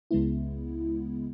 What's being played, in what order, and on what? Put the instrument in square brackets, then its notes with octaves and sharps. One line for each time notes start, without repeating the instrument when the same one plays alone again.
[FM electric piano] C#2 C#3 G#3 B3 E4